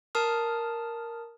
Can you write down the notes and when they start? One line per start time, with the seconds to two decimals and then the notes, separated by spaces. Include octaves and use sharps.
0.15 A#4 A5 D#6 F6